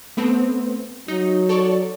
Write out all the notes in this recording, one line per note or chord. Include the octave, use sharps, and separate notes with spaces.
A3 B3 C4
F#3 D#4
A4 C#5 D5